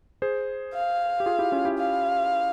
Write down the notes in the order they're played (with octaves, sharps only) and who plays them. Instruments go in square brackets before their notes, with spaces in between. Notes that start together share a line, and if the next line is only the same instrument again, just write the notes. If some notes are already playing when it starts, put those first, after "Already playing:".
[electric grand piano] G#4 C5
[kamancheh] F5
[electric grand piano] G4
F4 G#4
E4 G4
C#4 F4
E4 G4
[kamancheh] F5